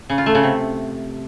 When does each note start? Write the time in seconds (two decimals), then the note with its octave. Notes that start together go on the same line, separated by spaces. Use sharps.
0.10 C#3
0.18 F4
0.26 A3
0.35 C#3
0.43 C3